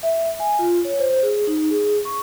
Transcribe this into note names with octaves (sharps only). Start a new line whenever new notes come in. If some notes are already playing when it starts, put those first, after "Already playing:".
E5
G#5
F4
C#5
C5
G#4
D#4
G#4
C#6